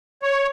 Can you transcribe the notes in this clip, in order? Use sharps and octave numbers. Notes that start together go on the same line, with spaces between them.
C#5